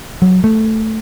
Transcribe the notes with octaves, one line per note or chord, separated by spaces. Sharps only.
F#3
A3